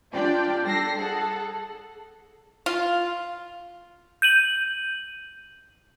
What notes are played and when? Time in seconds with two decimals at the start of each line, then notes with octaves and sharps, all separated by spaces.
0.13 D4 F4 G4 D5 G5
0.65 G3 D4 A4 A#6 C7
0.98 G#4 A4 F#5
2.66 F4
4.22 G6 D#7 F#7